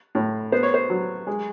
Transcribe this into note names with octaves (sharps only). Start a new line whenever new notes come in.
A2
B3 C5
C#5
C5
F#3
G#3